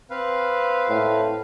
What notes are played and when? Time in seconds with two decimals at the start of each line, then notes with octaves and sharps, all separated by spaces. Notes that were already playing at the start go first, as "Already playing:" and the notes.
0.10 C4 B4 F5
0.89 A2